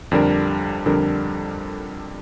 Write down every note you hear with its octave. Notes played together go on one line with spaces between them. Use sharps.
F2 D3 G3 D4 A#4
F2 D3 G3 D4 A#4